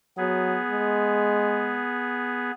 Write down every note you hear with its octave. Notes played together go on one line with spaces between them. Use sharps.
F#3 B3 G#4
G#3